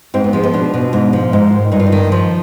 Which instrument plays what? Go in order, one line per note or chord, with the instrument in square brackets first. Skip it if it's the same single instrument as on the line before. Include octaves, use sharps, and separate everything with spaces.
[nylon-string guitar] G#2 C4
B3
F3 G#3
B3
B2 D4
B2
G#2
F3
G#2
D#3
G2 D#4
F4
D#4
D#3
F3